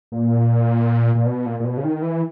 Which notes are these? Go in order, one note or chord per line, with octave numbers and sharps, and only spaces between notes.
A#2
A#2
B2
A#2
A#2
B2
C#3
D#3
E3